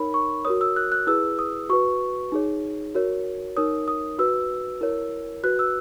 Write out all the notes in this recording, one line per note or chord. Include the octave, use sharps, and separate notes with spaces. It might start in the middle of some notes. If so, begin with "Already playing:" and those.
Already playing: D#4 A#4 C#5 B5
C#6
F#4 A#4 C#5 D#6
E6
F#6
F#6
E4 G#4 B4 E6
D#6
F#4 B4 C#6
D#4 G#4 C#5
F#4 A#4 C#5
D#4 A#4 C#5 D#6
D#6
F#4 B4 E6
E4 A#4 C#5
F#4 B4 F#6
E6